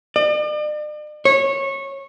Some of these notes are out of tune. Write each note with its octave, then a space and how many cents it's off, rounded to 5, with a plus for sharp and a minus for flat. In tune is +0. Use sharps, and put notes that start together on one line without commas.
D5 +45
C#5 -20